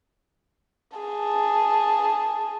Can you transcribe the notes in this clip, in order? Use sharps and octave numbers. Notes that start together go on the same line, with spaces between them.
G#4 A5